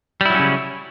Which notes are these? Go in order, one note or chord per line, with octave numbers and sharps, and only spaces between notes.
C#3 F#3 G3 C#4 E4